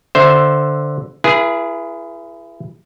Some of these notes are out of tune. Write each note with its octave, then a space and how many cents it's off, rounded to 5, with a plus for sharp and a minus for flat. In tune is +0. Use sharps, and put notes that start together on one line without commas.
D3 +0 C5 +0 E5 +0
E4 +35 G#4 +0 B4 -40